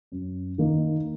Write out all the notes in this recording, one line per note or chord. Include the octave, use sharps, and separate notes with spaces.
F#2
D#3 A#3 D#4